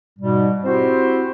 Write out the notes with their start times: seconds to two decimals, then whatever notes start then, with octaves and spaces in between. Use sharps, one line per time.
0.19 G#2 B2 G3
0.64 C4 E4 F#4 G4 C5